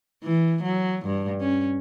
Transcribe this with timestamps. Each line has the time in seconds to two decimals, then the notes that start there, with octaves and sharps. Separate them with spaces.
0.24 E3
0.63 F#3
1.05 G2
1.41 C#4